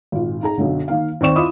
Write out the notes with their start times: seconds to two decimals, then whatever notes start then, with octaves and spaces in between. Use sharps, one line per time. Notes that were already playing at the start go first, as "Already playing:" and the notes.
0.12 G#1 A#2
0.43 D#4 G#4 A#5
0.58 B1 F#2 D3
0.88 D#3 A#3 F5
1.21 D#2 C4 D5 C#6 E7
1.36 E4 F4 D#5 B5 D6 D#6